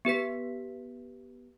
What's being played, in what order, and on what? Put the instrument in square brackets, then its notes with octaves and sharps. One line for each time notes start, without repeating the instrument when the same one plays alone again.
[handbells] B3 G4 B4 B6